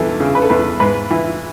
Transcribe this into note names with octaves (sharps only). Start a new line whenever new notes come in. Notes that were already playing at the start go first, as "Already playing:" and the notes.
Already playing: E2 E3 A4
C#3
B4
A4
E2 B4
G#2 B4
E3